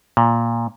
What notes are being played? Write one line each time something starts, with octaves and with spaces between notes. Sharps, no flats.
A#2